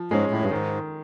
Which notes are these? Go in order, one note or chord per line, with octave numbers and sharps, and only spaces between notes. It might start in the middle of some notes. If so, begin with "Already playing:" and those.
Already playing: F3
G#2 G#3 C#4
A2
G2
G#2 D#3